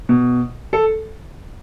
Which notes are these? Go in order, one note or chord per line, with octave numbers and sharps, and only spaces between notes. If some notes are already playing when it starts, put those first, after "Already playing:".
B2
A4